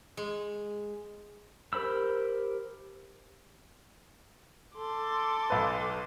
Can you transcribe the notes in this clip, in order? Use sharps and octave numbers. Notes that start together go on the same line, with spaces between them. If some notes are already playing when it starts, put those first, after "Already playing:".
G#3
G4 A#4 C5 B5 E6
A4 C6 D6
B1 B4